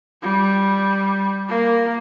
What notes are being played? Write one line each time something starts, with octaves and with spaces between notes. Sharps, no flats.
G3
A#3